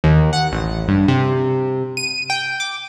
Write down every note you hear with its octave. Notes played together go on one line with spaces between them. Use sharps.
D#2
F#5
A1
G2
C3
D#7
G5
D6